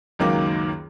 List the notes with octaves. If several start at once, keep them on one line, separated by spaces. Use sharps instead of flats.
C#2 F#2 D#3 F#3 A#3 D6